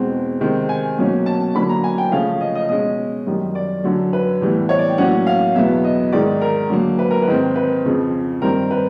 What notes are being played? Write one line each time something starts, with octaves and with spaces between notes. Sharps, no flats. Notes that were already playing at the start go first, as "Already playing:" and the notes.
Already playing: E2 B2 G#3 C4
C3 D#3 G#3 C4
G#5
B2 F#3 A#3 C#4
A5
D3 F#3 A#3 C#4 B5
A#5
G#5
G5
C#3 F3 A3 C#4 F5
D#5
D#5
B2 G#3 C#4 D#5
F#2 D#3 G3
D5
F#2 D3 F#3
B4
A2 E3 G3 B3
C#5
D5
G5
A2 F#3 A#3 C#4 F#5
F5
E2 B2 F#3 B3 E5
D#5
G#2 D#3 G#3 D5
A#4
D3 F#3 A#3
B4
A#4
B4
G#2 D#3 G#3 C4
B4
F2 C#3 F3
G2 D#3 G3 C4 A#4
B4